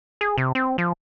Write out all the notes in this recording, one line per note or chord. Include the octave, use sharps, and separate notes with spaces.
G#4
C3
C4
F3